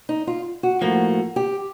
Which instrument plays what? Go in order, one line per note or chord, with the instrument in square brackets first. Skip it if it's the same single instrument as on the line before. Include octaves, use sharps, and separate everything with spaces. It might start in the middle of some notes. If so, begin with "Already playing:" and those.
[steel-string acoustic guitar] D#4
F4
F#4
[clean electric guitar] A2 F3 A#3 [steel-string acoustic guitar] F#4
[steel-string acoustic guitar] G4